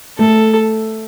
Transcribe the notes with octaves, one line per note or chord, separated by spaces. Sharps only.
A3 A4